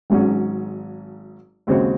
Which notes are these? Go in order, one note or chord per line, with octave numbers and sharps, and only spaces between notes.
G#1 G#2 F#3 C#4
D#2 C#3 G#3 C4 F#4